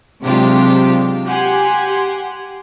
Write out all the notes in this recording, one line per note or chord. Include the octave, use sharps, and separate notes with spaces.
C3 F#3 G#3 D4 F4 G4
G4 F#5 G#5 C6